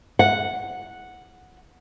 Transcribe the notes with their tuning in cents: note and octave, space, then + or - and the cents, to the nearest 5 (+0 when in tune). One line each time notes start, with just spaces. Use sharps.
F#5 -5